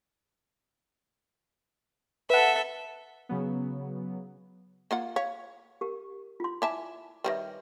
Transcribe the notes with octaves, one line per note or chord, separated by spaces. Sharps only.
A4 B4 E5 F#5
C#3 F#3 B3
A#3 F4 F#5
C#5 F5
G4 A#4
F4 C6
E4 E5 G#5 A5 D6
D#3 F#3 G3 B4 C#5 E5